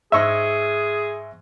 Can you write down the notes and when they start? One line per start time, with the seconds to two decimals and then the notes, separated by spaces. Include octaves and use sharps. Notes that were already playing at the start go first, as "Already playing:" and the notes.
0.12 G#2 G#4 D#5 E5 C#6 E6